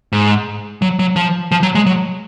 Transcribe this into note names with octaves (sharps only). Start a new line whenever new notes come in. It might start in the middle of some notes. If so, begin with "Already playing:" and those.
G#2
F#3
F#3
F3
F3
F#3
G#3
F#3